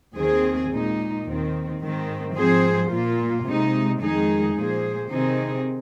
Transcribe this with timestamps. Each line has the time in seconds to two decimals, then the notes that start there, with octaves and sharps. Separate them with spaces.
0.15 D#2 D#3 C4 G#4
0.69 A#2 G#3 D#4
1.25 D#2 D#3 C4
1.80 G#2 D#3 C4
2.35 G#2 F3 C4 G#4 C5
2.90 A#2 A#3 F4
3.45 C3 G#3 D#4
4.00 F2 D#3 G#3 D#4 G#4
4.55 A#2 F3 A#3 G#4 C5
5.10 C3 D#3 C4 D#4 G#4